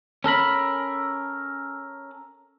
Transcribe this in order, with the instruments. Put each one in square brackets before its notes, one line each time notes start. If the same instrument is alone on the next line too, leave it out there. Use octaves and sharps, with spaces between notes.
[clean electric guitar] C#4 A4 A#4 B5